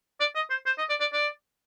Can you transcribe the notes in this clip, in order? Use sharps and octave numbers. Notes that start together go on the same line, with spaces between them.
D5
D#5
C5
C5
D#5
D5
D5
D5